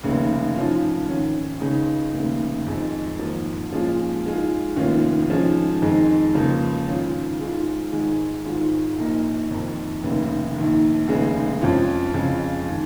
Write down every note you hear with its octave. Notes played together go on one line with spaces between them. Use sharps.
F1 D#2 C#3
G#2 F3 C#4 F4
G#2 D#3 C#4
C#2 C#3 G#3 D#4
F1 D#2 C#3
F2 D#3 G#3 D#4
G#1 G#2 F3 A#3
A#2 F3 G#3 C#4 F4
G#2 G#3 F4
F1 D#2 D#3 C#4 F4
G#2 F3 G#3 C#4 F4
F2 D#3 G#3 D#4
C#2 C#3 F3 A#3
G#2 D#3 C#4 F4
G#2 G#3 F4
G#1 G#2 G#3
G#1 G#2 G#3 F4
A#1 A#2 A#3 D#4
F2 D#3 A#3
F1 D#2 C#3
A#1 G#2 D#3
F1 D#2 C#3 G#3
F2 F3 C#4 F4
F2 C#3 G#3 F4
D#3